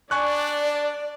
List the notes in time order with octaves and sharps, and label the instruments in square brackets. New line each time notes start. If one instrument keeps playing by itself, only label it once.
[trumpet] D4 [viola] D5 [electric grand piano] G#5 C#6 F#6